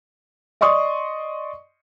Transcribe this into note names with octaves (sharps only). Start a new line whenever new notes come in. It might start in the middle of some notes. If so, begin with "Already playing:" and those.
D5 D#5 C6 C#6 D#6